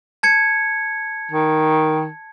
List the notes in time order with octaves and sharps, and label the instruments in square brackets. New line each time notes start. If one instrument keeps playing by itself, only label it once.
[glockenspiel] A5 G#6 C#7
[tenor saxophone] D#3